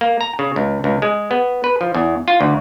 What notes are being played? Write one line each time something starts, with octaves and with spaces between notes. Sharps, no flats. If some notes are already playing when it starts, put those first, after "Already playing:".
A#3
A#5
C#3
C#2
C#2
G#3
B3
B4
F3
E2
F4
D2